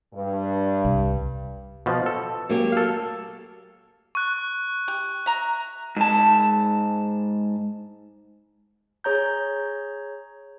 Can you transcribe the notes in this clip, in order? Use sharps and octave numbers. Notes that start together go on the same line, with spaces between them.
G2
C2
B2 F3
A4
F#3 A#3 G4
A4 F5
C#6 F#6
G4
E5 A#5
G#2 A5
G#4 C#5 A#5 G6